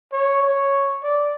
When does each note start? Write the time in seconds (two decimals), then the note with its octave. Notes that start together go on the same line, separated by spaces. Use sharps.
0.13 C#5
0.43 C#5
1.04 D5